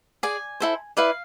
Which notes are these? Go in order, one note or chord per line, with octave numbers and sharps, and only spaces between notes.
G#4 D5 G#5
E4 A4 C5
E4 B4 D5 F5